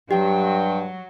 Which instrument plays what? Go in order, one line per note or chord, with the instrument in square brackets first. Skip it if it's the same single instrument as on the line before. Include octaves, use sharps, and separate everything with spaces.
[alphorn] G2 [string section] F#3 [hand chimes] G4 [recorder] G5